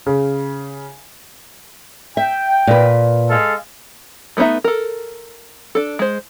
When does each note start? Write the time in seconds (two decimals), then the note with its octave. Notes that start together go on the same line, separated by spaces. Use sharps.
0.06 C#3
2.17 E5 G5
2.67 A#2 B4
3.30 G#3 A4 F5
4.37 A3 B3 D4 D#4 E5
4.64 A4 A#4
5.75 D4 A4
5.99 G#3 C5